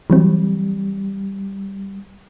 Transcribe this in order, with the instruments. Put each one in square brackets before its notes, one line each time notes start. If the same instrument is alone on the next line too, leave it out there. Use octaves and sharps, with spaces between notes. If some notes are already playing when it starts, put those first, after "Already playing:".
[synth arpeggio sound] E3 F#3 C4 [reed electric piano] G3